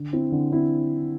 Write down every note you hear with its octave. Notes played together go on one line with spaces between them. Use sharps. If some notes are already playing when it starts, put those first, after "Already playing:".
Already playing: D3
C4 E4
D3
C4 E4